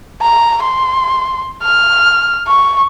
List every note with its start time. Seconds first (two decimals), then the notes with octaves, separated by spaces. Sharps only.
0.21 A#5
0.63 C6
1.63 F6
2.47 C#6